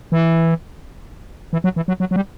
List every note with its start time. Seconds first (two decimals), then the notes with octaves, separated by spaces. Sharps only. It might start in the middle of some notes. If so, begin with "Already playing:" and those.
0.12 E3
1.53 E3
1.64 F#3
1.76 E3
1.88 F#3
2.00 F#3
2.11 F#3
2.16 G3